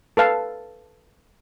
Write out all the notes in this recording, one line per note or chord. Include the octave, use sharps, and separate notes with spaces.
A4 B4 F5 A5